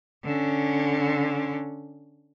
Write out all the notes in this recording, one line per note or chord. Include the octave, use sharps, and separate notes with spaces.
D3 C#4